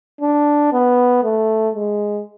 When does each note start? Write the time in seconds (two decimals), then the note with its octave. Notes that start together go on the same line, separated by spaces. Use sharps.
0.21 D4
0.73 B3
1.23 A3
1.75 G#3